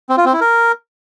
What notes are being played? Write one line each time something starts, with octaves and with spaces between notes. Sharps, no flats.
C4
F4
C4
E4
A#4